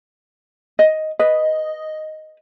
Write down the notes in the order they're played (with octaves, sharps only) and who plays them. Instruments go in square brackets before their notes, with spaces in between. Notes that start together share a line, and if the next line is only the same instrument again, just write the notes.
[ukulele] D#5
[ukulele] B4 [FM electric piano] D#5